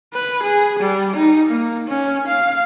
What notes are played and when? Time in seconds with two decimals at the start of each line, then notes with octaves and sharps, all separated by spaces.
0.14 B4
0.43 G#4
0.80 G3
1.17 D#4
1.48 A#3
1.88 C#4
2.28 F5